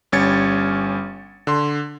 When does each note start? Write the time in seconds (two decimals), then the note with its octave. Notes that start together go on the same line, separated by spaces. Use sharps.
0.12 G1 G3 C#4 G#6 A6 C#7
1.47 D3 C6